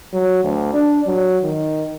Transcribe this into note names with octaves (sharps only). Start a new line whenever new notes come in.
F#3
D2
D4
F#3
D#3